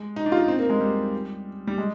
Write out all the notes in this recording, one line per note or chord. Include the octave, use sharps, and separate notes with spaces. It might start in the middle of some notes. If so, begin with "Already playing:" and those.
Already playing: G#3
D#4
D4
F4
D#4
C4
A#3
G#3
G3
G3
G#3